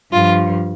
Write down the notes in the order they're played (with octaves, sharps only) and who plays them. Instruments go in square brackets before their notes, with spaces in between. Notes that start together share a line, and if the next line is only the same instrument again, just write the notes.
[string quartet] G2 F3 F4